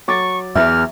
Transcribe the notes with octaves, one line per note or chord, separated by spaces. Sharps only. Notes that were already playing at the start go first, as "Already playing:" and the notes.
F#3 C#6 D6 A6
E2 E5 F6